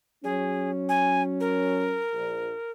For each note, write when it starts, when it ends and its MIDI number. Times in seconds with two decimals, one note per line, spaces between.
0.24 2.03 54
0.24 2.03 61
0.24 0.71 68
0.89 1.22 80
1.40 2.71 70
2.13 2.51 34